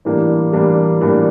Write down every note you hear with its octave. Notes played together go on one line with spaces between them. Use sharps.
A2 E3 G3 A#3 D4
A2 E3 G3 A#3 D4
A2 E3 G3 A#3 D4